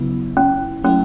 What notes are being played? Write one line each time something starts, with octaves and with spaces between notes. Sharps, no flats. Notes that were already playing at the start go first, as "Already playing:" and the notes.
Already playing: C#3 F#3 B3 E4
C#4
F#3 A3 C#4 E4